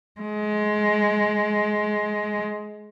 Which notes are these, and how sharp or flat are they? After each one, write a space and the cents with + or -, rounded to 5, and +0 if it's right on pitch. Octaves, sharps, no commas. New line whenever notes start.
G#3 +20